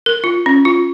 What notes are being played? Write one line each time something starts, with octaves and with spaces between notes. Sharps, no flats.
A#4
F4
C#4
F4